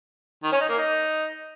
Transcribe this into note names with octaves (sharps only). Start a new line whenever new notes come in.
D#3
C#4
D#4
A#3
D#4